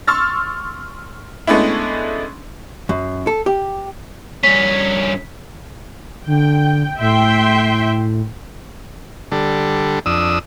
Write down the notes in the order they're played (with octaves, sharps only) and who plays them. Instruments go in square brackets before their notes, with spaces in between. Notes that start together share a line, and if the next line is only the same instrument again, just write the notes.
[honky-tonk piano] C6 C#6 E6 F6 A6
G#3 A3 B3 C#4 D4 E4
[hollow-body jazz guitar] F#2
A4
G4
[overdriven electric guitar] G2 C#4 [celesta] B6
[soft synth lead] D3 [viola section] G5
[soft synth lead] A2 [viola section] E5 G5 C6
[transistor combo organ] D3 G3 A4
F2 D4 D#6 E6